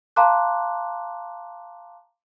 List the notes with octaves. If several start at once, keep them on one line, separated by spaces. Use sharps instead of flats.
F5 A5 A#5 C6 D6 F#6